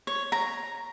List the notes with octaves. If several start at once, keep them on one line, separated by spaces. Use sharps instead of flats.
C#5
A#5